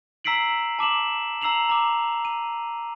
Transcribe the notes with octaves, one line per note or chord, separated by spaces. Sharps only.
A#5 E6 B6 C7 D7 F#7
A5 D6 E7 F#7
A#5 E6 C7 F7 F#7
A#5 D6
D#7